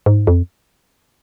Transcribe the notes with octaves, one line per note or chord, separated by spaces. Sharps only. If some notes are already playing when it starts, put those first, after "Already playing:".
G#2
F2